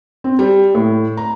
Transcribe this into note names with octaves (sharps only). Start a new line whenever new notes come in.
C4
G3
A2
A#5